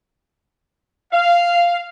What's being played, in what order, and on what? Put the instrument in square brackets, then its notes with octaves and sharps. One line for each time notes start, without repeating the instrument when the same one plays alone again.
[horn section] F5